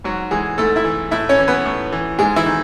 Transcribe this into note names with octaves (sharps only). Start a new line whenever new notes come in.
G#2 F#3 F#4
E3 G#3 G#4
G#2 A3 A4
E4 E5
E3
A2 E4 E5
C#4 C#5
E3
B3 B4
A2
E3
G#2 G#3 G#4
E3 E4
D#3